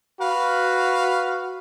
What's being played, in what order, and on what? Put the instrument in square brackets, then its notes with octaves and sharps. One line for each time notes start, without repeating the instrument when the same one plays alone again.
[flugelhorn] F#4 [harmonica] B4 F5